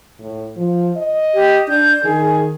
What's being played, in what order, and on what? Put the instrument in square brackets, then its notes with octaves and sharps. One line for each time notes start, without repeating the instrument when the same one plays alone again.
[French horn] A2
F3
D#5
[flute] G4
[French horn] D4 [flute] G6
[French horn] D#3 [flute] G#4